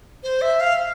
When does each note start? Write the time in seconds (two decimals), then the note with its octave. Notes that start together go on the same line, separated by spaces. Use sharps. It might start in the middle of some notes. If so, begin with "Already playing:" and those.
0.23 C5
0.42 E5
0.60 F5